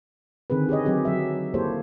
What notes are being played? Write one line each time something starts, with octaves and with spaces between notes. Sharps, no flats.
D3 D#3 C4 G#4 B4
G4 G#4 C#5 D#5
F#3 C4 G4 G#4
F#3 E5
A#3 E4 G4 A4 C5 C#5